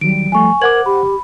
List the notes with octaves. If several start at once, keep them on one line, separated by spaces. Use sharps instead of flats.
D#3 F#3 G3 D7
F3 A3 G#5 C#6
A#4 C5 F#5 D6 G#6 F#7
G4 B5